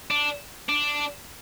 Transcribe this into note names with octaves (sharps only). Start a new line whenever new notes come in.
D4
D4